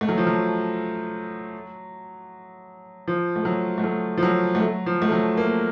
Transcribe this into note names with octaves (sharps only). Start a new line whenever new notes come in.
A3
F#3
F3
F#3
F3
A3
F#3
A3
F#3
F3
F#3
A3
F#3
F3
A3
F#3
A#3